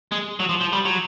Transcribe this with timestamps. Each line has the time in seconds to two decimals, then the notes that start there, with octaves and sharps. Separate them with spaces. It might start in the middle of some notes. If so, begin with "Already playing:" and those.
0.12 G#3
0.40 F#3
0.49 F3
0.61 F3
0.73 G3
0.85 F#3